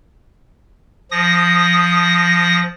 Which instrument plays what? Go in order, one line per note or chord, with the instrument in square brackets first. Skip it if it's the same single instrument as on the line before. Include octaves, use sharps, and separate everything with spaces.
[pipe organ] F3 D#6 A#6